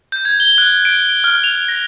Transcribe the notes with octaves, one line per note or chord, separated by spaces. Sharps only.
G6
G#6
G7
F#6
D7
F6
F7
A#6